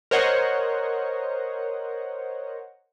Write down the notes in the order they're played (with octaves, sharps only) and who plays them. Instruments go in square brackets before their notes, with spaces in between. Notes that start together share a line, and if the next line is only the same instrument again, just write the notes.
[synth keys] A#4 C5 C#5 D#5 F#5